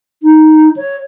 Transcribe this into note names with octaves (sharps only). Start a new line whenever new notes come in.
D#4
C#5